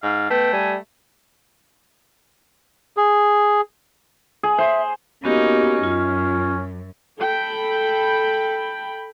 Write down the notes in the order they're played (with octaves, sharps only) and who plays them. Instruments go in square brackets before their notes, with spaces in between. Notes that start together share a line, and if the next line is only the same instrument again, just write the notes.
[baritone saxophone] G#2 [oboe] F5
[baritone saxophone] A3 [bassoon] B3 [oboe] G5
[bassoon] G3 [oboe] G#5
[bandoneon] G#4
[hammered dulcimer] G#4
[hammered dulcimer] C5 [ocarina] E5
[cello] A#3 D#4 [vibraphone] B3 F#4 G4 [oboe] C#4
[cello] F#2 [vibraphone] F4
[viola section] A4 G5 B5